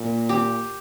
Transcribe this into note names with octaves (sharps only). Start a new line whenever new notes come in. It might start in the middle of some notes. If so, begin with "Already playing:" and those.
Already playing: A#2
G4